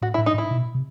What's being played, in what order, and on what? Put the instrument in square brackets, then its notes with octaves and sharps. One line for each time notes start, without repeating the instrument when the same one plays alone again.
[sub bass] A2 [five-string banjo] F#4
[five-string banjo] E4
[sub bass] A2
[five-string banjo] D#4
[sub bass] A2 [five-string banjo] E4
[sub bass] B2
C3